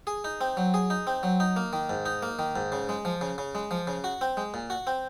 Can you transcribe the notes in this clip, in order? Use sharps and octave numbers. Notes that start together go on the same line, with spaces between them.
G#4
D#4
C4
F#3
G#4
D#4
C4
F#3
D#4
A#3
D#3
G#2
D#4
A#3
D#3
G#2
C#3
G#3
F3
C#3
C#3
G#3
F3
C#3
F#4
C4
G#3
A#2
F#4
C4